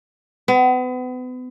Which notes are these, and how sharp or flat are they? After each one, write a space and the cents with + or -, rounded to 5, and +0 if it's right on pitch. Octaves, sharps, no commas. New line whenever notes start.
B3 +35